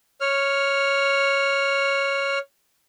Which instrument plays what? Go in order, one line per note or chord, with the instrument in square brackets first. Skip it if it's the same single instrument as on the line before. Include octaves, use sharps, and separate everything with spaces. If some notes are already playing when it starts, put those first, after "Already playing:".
[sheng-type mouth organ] C#5 F6